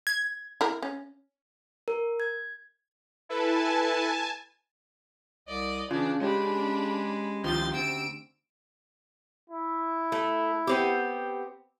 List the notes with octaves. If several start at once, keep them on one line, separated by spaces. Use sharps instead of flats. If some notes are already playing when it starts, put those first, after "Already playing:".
G#6
E4 A#4
C#4
A#4
G#6
E4 A4 B4 G#5 A5
C2 D5 D#5
C#3 E3 D4 F4
G#3 C#4 D4 G4 B5
C#2 D#3 F3 C6 A6
D2 C4 E6 D7
E4
A3
B3 C4 G4